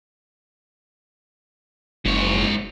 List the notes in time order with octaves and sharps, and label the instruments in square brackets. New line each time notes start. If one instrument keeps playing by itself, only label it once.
[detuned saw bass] F#1 [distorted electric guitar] G#2 C#5